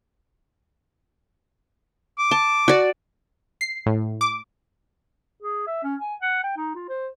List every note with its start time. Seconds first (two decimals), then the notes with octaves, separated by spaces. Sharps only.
2.19 D6
2.31 A5
2.68 F#4 D5
3.61 C7
3.86 A2
4.21 D6
5.42 G#4
5.67 E5
5.83 C#4
6.00 G#5
6.22 F#5
6.43 G5
6.57 D#4
6.75 F4
6.89 C5